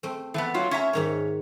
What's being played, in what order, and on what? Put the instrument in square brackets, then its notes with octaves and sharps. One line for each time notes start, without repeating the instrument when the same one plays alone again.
[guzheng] A3 C4
[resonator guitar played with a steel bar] E3 B3 [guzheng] A4 A5
[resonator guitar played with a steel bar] F#3 F4
C#4 E5 A#5
[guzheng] G#2 D#3 C#5